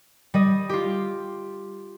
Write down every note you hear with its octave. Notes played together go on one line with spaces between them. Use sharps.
G3 D#5
F4 G4